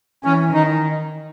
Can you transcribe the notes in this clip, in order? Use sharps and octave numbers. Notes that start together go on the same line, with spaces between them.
E3 C#4
D#3 D#4